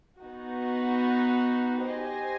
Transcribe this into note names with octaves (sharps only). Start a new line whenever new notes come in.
B3 D#4 F#4
G4 C5 D#5 G#5